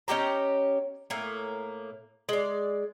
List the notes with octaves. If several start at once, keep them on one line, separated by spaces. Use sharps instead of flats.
C#4 D#4 G4 A#5
A2 A#3
G#3 D5